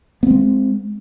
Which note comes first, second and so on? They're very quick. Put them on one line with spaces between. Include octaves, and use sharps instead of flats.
B3 C4 G#3